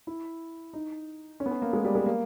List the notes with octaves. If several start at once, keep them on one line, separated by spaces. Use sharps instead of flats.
E4
D#4
C#4
B3
C#4
A#3
G#3
G3
G#3
A#3